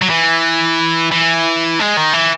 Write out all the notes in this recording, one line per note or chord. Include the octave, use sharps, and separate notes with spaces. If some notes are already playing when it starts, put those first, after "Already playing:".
F#3
E3
E3
G#3
D#3
E3